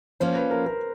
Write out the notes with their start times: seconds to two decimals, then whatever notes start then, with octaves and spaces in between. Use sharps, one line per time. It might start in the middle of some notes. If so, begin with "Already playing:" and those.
0.20 F3 A#3 C#4 C5
0.35 B4
0.51 A#4
0.66 A#4